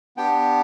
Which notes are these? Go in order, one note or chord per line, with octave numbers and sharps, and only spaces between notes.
B3 D4 G4 G5